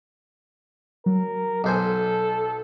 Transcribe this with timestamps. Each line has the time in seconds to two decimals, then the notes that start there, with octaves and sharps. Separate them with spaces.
1.06 F#3 A#4
1.64 B1 A4 C5 G#5